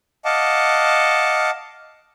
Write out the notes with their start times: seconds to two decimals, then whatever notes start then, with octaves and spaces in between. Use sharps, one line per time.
0.25 D#5 F5 F#5 A5 D6